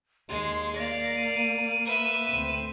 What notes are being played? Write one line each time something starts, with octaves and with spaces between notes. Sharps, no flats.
D#2 G#3 C6
A#3 D5 F5 A#6
D#7
B4 E5
D2 C4